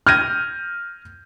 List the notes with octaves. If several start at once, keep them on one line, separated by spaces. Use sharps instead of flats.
F6 G6 G#6 A#6 D#7